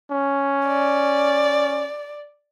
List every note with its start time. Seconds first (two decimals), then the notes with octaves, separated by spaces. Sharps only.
0.11 C#4
0.68 D5